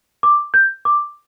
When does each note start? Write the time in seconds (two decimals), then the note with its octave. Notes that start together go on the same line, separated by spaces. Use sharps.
0.23 D6
0.54 G6
0.85 D6